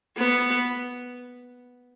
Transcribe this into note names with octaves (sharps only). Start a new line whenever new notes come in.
B3